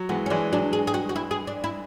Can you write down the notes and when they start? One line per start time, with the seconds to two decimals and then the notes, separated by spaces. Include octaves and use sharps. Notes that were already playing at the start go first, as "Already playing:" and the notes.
Already playing: F#3
0.09 E3 G#3 B3
0.26 C#4
0.30 E3 G#3 D4
0.52 F#3 D4
0.73 G#4
0.87 G#4
0.94 F#4
1.09 F#4
1.16 E4
1.31 G#4
1.47 D4
1.64 E4